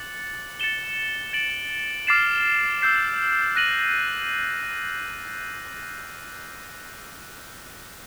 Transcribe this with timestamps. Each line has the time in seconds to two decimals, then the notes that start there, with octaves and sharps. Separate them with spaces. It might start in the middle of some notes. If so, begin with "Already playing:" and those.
Already playing: D6 F#6 A6 C#7 F#7
0.60 A6 C#7 E7 G7
1.33 A6 D7 F#7
2.07 D6 F6 A6 C7 E7
2.82 E6 G6 C7
3.55 F#6 A#6 D#7 F#7